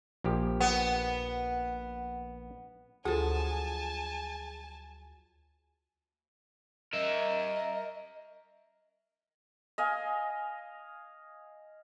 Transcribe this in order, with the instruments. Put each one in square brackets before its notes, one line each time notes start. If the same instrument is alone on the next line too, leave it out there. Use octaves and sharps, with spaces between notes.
[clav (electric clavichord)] A#1 F3 G4
[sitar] B3
[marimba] D2 A4 [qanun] F3 F#3 [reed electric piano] G#4 [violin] G#5 A5
[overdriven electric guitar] A#4 E5 [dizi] D#5
[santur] D#5 F5 G#5